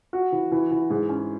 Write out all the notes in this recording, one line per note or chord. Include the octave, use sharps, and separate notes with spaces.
F#4
E3
E3
E3
G#2
C#4